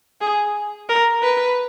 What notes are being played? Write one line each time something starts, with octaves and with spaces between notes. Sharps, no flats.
G#4
A#4
B4